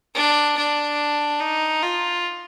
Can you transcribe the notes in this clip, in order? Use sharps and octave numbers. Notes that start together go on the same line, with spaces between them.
D4
D4
D#4
F4